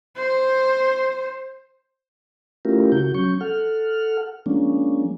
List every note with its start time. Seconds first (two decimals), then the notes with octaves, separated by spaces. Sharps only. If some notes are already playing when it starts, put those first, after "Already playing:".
0.17 C5
2.65 A3 C#4 E4 F4 G4 A#4
2.92 C#3 F#4 G6
3.14 F#3 C#4 C#6 G6
3.41 A4 F#5 F6
4.46 F3 G#3 A#3 C#4 D4